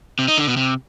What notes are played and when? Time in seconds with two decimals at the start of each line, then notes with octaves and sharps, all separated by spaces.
0.19 C3
0.28 D#4
0.38 D3
0.47 B2
0.57 C3